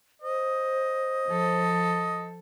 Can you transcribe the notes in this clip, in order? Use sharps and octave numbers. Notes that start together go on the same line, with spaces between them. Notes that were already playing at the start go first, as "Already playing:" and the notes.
C5 D#5
F3 A4